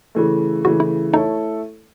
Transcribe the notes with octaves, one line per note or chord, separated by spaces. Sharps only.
C#3 E3 A3
C#3 E3 A3 F#4
E4
A3 D#4 E4 A4 C#5